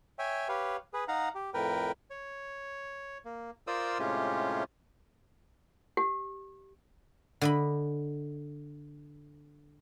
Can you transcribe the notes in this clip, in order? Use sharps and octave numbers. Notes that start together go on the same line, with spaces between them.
C#5 E5 G5 G#5
G4 B4 C#5 F5
G#4 B4
D#4 F5 F#5 A#5
G4
F2 A2 A#4 B4 G5
C#5
A#3
F4 A#4 C5 D5 D#6 E6
A2 C3 G#3 C#4 F4 G4
G4
D3 D#5 B5